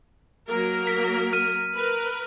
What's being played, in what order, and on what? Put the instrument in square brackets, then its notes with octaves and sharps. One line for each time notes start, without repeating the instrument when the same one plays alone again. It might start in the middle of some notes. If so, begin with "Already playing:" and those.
[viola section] F#3 A#3 A#4
[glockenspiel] B6
F6 D#7
[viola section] A#4 B4